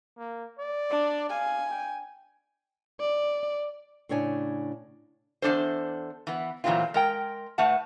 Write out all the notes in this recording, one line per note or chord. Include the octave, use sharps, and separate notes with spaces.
A#3
D5
D4
F5 G#5
G5
D5
A2 C#3 D4 C#5 G#5
E2 D#3 D4 A4 C5
E3 B3
A#2 E3 F#3 A3 C4 F4
G#3 A#4 G5
A2 A3 B4 F#5 A5